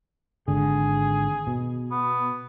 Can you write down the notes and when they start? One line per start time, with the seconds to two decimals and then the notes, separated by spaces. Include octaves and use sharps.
0.48 G#1 D3 G#4
1.47 B2
1.91 B3